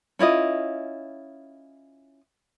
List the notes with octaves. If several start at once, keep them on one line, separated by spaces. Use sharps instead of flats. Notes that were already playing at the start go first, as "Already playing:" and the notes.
C#4 E4 F4 D#5